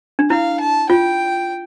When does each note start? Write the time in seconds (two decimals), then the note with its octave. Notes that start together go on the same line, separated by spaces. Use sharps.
0.19 D4
0.30 E4 F5
0.60 A5
0.89 F4 G5